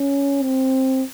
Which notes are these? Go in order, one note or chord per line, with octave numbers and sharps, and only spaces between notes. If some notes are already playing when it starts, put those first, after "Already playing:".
Already playing: C#4
C4